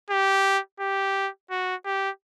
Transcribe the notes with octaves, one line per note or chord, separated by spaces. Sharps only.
G4
G4
F#4
G4